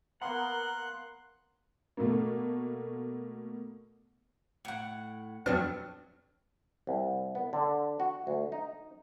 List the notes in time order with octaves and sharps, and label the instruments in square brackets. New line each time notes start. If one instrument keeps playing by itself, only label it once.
[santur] A#3 B3 [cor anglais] A#4 [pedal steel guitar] F#5 [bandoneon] C6 F#6
[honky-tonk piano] B2 A3 A#3
[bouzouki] A2 F#5
[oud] F2 F#3 [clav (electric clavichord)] B3 C4 D4 [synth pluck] F6
[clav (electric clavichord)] C2
B3
D3
F#4
D2
D#4